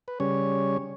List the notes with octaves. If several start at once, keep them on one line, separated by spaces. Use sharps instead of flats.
B4
C#3 G3 C#4 C#5